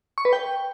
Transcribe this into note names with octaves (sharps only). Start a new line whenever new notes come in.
C#6
B4
G5